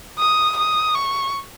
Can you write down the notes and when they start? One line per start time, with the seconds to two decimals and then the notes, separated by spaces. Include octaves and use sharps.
0.19 D#6
0.57 D#6
0.95 C#6